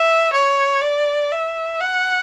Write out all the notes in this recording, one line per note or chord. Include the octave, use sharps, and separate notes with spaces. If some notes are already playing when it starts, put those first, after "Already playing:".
Already playing: E5
C#5
D5
E5
F#5